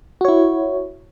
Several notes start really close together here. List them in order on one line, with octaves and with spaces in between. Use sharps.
F#4 C#5 E4